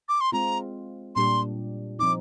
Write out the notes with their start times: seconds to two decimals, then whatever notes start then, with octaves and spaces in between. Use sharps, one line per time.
0.09 D6
0.21 C6
0.32 G#3 C4 F4 A#5
1.15 A#2 G3 D4 G4 C6
1.99 F3 C4 D#4 D6